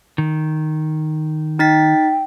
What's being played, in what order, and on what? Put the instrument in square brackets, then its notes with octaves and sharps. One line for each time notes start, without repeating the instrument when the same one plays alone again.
[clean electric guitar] D#3
[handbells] D#4 A6 B6 [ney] G5